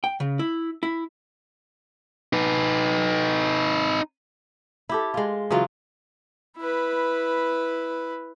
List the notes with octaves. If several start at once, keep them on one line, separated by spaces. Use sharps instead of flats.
G5
C#3
E4
E4
D#4 B4
E4 G4 A4
G#3 F4
C#3 E3 F#3 F4
E4 B4